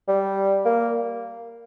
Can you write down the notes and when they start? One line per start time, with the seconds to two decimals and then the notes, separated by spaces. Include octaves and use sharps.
0.08 G3
0.65 A#3